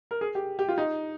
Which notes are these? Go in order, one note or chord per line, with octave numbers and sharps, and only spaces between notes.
A#4
G#4
G4
G4
F4
D#4